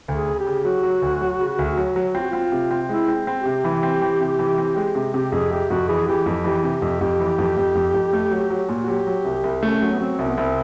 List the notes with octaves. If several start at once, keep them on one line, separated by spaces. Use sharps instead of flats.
D2
G#4
C#3
G4
C#3
F#3 F#4
F#3
D2
F#3
C#3
D2
F#3
F#3
C4 F4
F#4
C4 F4
C3
C4
G#3 E4
C4
C4
G4
C3
E3
C4
E3
C3
E3
C4
G#3
C3
C3 G4
F2 G#4
C3 G4
F2 F#4
E3 G#4
E3 G4
F2
E3 G4
C3 G4
F2
F2 G4
E3
F2
F2
F2
F2
A3
F#3
F#3
A#2
F#4
F#3 G4
F#3
C2
C2
A3 C#4
F#3
B3
F#3 C4
C2
B3
C2 C4